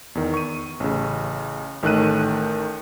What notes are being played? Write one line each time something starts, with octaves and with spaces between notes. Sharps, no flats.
E2 D#3
C#6 D#7
A1 C#3
A1 D#3 A3 F#6 D#7